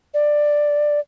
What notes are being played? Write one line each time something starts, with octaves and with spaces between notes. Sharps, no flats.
D5